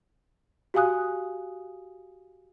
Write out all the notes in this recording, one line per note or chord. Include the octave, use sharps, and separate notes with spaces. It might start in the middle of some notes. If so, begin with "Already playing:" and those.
F#4 G4 F5 G#5 D#6 F#6